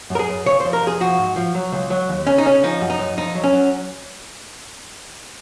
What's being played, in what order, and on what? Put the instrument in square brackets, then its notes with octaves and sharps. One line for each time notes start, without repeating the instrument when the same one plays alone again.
[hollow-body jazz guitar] F#2
A#4
G#4
F#2
C#3 C#5
F2 C5
A#4
F2 G#4
F3 F#4
G#2
F3
F#3
C#2
F#3
D#2
C#3 C#4
D#4
C#3 C#4
F3 D#4
F#2
D#4
F#2
F2 D#4
F#3
C#4
F#3